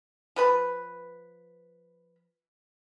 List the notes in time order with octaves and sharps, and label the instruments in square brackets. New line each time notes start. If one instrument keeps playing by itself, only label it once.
[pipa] F3 B4 B5